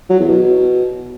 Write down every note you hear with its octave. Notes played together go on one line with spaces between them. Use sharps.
F#3
E2
B2